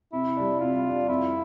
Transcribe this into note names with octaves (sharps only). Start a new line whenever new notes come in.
C3 E4
G3 D4
C3 F4
G3 D4
F2 E4